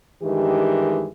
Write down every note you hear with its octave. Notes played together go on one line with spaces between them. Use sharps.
G2 D#3 E3 G#3 G4